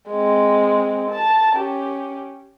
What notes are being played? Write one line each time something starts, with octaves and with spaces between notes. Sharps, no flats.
G#3 C4
A5
C#4 G4